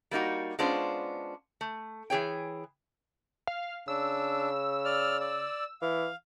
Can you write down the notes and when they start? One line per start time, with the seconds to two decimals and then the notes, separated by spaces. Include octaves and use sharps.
0.11 G3 A#3 D#4 F#4
0.59 G#3 B3 C#4 D4 F4 C5
1.61 A3
2.10 E3 G#4 C#5 G5
3.47 F5
3.88 C#3 D4 E6
4.85 D5 F6
5.20 D5
5.82 E3 F5